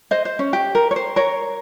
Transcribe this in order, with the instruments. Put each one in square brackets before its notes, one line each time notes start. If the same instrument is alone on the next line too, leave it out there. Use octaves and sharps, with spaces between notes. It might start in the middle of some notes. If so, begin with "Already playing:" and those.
[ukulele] C5 D#5
C5
C#4
G4
A#4
C#5
C5
A#4 C#5